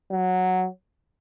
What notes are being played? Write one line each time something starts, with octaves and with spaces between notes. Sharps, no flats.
F#3